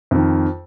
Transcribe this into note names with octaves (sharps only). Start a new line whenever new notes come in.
F2 D#3